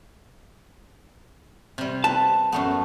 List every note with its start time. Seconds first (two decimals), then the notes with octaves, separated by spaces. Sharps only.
1.78 C3 G3
2.04 B4 A5
2.52 F#2 A3 B3